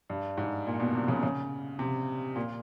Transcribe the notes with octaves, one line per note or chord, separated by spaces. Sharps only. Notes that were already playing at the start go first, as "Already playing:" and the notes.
G2
G#2
A#2
B2
C3
C#3
C#3
C3
A#2